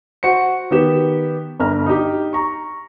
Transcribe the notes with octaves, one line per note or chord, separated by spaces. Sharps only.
F#4 C5 C#7
D#3 B3 G4 E7
G1 A#5 F6
D#4 G4
A#5 C#6